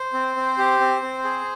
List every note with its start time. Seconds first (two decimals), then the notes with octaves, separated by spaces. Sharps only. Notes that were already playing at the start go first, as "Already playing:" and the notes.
Already playing: C5
0.13 C4
0.36 C4
0.58 G4
0.80 C4
1.02 C4
1.24 G#4